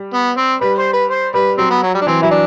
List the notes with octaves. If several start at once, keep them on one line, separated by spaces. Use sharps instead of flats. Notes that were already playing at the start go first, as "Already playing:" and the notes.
Already playing: G3
B3
C4
G3 B4
C5
B4
C5
G3 B4
F#3 C4
B3
F#3
G3
D4
E3 C4
F#3 E4
D4